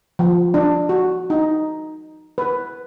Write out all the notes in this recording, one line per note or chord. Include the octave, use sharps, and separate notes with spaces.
F3
D4
F#4
D#4
B4